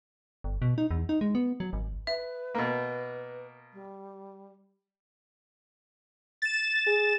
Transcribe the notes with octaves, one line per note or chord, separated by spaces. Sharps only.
G1
B2
D#4
E2
D#4
G#3
B3
F#3
G#1
B4 E5
B2 A#3
G3
A6 E7
G#4